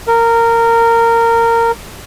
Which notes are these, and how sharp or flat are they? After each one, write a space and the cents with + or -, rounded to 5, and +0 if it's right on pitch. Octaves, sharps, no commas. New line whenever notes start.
A#4 -15